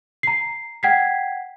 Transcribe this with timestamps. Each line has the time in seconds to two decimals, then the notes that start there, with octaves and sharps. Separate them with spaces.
0.23 A#5 C7
0.83 F#5 G5 G#6 B6 C7